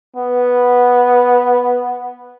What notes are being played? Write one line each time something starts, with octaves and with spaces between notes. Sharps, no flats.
B3